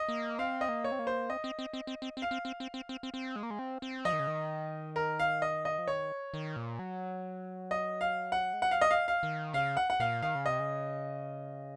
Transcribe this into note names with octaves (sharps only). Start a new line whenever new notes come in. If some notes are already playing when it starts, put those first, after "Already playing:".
Already playing: D#5
A#3
C4 F5
D#5
A#3
C#5
C4
A#3
C5
C4 D#5
C4
C4
C4
C4
C4
C4
F5
C4
C4
C4
C4
C4
C4
C4
G#3
A#3
G#3
C4
C4
F3 D#5
D#3
C#3
D#3
A#4
F5
D#5
D#5
F3
D#3 C#5
D#3
A#2
F#3
D#5
F5
F#5
G#3
F#3 F#5
F5
D#5
F5
F5
D#3
C#3 F5
F#5
F#5
A#2 F5
D#3 F5
C#3
C3 D#5
C#3